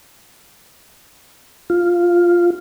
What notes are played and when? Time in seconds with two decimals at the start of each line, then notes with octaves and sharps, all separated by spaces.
1.70 F4